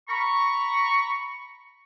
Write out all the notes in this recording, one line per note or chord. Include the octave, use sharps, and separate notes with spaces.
A#5 B5 C#6